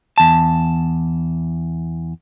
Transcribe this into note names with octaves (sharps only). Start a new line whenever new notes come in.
E2 A5